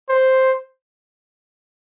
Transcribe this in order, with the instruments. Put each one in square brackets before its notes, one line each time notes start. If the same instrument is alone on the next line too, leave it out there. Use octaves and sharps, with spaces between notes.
[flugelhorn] C5